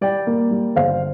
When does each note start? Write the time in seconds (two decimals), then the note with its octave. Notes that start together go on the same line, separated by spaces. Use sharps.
0.01 G3 D5 G5
0.27 A#3
0.51 G3
0.76 G1 C5 F5